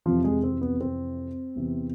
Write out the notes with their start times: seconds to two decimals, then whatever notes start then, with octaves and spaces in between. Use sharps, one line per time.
0.06 F2 C3 E3 F3 F4
0.24 G#3 G#4
0.43 C4
0.61 B3
0.81 C4
1.55 E2 C3 E3